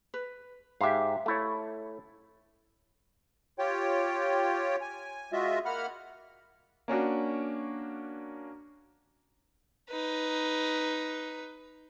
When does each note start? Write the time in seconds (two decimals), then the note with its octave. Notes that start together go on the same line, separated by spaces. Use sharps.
0.14 B4
0.81 G#2 G4 E5 F5
1.26 A3 E4 C#5
3.59 F4 G4 C#5 G5
4.81 G#5
5.33 G#3 F4 F#4 D#5 E5
5.65 A#3 F#5 B5 F6
6.88 A#3 C#4 D4 F#4
9.90 D#4 B4